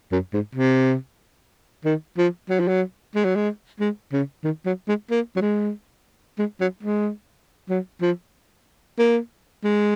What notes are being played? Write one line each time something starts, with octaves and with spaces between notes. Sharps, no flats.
F#2
G#2
C3
D#3
F3
F#3
F3
F#3
G#3
F#3
G#3
G#3
C#3
D#3
F#3
G#3
A#3
F#3
G#3
G#3
F#3
G#3
F#3
F3
A#3
G#3